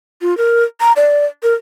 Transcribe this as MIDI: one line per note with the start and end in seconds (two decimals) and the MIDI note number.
0.22 0.37 65
0.37 0.63 70
0.80 0.93 82
0.96 1.25 74
1.43 1.54 70